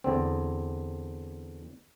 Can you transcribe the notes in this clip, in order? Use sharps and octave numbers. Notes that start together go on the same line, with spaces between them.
E2 D3 C4